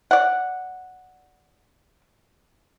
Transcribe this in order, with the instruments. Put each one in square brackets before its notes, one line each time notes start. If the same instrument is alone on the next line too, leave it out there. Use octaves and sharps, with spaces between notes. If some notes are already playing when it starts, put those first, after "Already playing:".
[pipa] D5 F#5